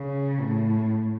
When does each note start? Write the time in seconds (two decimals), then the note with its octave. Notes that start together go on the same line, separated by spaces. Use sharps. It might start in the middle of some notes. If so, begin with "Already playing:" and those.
Already playing: C#3
0.41 A2